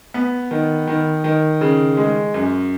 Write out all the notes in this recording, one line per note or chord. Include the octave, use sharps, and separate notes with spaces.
B3
D#3
D#3
D#3
C#3
G#3
F#2